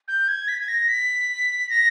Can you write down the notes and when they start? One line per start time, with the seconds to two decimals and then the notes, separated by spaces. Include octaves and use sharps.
0.08 G6
0.28 G#6
0.48 B6
0.60 G#6
0.68 A#6
0.88 B6
1.70 A#6